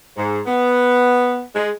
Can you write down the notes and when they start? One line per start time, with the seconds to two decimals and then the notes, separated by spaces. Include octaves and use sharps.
0.17 G#2
0.46 B3
1.56 G#3